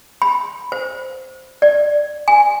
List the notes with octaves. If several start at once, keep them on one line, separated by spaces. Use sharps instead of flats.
B5
C5
D5
G#5